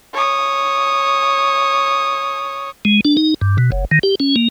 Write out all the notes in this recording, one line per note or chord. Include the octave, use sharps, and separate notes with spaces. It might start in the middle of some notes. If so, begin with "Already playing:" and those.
C#5 D#6
G#3
D4
D#4
G2
B2
F#1
D#3
G4
C#4
A#3